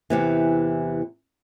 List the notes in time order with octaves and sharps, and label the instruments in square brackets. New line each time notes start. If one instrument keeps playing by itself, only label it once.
[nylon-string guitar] E2 C3 E3